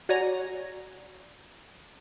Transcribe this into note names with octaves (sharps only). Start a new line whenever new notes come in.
F#4 C#5 D5 G#5 A#5